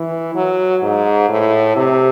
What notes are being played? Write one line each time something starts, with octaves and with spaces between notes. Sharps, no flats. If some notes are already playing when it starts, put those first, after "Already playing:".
Already playing: E3
F#3
G#2
A2
C3